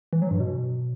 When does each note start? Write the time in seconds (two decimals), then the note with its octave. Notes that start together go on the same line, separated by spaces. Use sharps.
0.13 E3
0.22 F#3
0.31 G2
0.40 B2